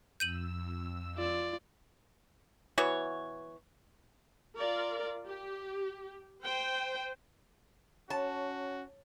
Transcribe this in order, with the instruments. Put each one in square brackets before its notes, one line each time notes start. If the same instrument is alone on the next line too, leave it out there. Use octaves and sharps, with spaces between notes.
[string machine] F2 E6 [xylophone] G6 D#7 F#7
[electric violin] F4 D5
[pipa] E3 B3 F#4 C#5
[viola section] F4 A#4 D5
G4
C5 G5
[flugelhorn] C#4 [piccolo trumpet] F#4 [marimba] C#5 [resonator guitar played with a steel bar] A5